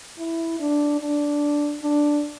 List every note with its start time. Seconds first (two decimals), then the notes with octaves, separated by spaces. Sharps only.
0.18 E4
0.60 D4
1.00 D4
1.83 D4